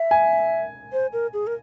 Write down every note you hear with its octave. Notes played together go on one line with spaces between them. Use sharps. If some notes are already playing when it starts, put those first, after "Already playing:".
Already playing: E5
G#5
C5
A#4
G#4
A#4